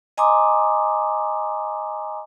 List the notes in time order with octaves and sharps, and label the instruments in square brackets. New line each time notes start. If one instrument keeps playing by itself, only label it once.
[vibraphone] D#5 G#5 A#5 C6 D6 D#6